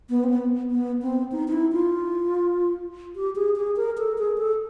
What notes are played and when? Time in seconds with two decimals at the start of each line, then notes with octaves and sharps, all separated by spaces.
0.10 B3
0.24 C4
0.30 B3
0.71 B3
1.02 C4
1.32 D#4
1.48 D#4
1.52 E4
1.73 F4
3.16 G4
3.36 G#4
3.56 G#4
3.76 A#4
3.98 A4
4.18 G#4
4.38 A4